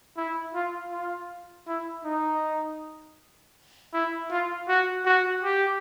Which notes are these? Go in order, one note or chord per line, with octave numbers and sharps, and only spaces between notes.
E4
F4
F4
E4
D#4
E4
F4
F#4
F#4
G4